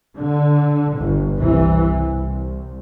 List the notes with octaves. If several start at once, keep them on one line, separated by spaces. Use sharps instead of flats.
D3
G1
C2 E3
C2